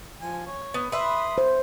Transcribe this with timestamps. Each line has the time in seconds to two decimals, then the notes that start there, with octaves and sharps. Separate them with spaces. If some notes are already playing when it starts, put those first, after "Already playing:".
0.20 F3 G#5
0.47 C#5
0.74 B3
0.92 B4 E5 B5 C6 D#6
1.38 C5